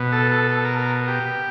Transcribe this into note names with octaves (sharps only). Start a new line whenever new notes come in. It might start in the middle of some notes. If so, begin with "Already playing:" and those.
Already playing: B2
A4
A4
A4
A#4
A#4
G4